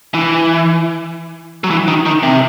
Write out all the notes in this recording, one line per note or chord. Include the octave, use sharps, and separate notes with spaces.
E3
F#3
E3
D#3
D#3
C3